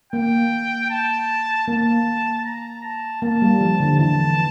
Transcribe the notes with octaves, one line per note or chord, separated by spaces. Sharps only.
A#3 G5
A5
A#3 A5
A#5
A5
A#3 A5
G3
F3
D3
E3 A5